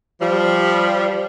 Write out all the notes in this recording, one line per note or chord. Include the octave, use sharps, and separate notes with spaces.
F3 G3